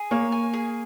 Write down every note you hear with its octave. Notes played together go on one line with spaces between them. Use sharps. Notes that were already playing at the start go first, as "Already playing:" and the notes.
Already playing: G#4
A#3 C#5
G#5
G#4